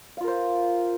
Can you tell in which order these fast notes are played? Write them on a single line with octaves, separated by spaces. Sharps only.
F5 F4 A#4 C5